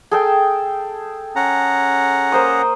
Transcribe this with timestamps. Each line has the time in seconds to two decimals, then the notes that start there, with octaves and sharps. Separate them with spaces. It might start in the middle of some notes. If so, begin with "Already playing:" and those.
0.11 G#4 A4 G5
1.36 C#4 F#5 A#5
2.32 A#3 C5 D#6